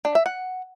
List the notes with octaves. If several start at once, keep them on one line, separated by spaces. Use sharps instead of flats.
D4
E5
F#5